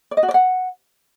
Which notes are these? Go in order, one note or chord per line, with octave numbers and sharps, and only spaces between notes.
D5
D#5
F#4
D5
F#5